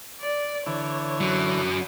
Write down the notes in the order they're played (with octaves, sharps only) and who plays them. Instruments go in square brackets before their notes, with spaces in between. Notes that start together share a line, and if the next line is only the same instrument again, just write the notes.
[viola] D5
[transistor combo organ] D3 E3 [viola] C#5
[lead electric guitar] F#2 F#3